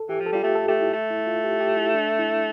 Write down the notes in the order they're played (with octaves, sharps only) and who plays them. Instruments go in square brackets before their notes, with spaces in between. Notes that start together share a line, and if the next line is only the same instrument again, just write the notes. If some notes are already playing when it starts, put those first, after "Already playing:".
Already playing: [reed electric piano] A4
[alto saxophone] E3 [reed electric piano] G4
[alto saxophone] F3
[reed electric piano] A4
[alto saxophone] G3 [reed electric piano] F4
[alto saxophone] A3 [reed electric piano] G4
[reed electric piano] A4
[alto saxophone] A3 [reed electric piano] G4
[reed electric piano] E4
[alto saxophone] A3
[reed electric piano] E4
F4
G4
G4
E4
D4
E4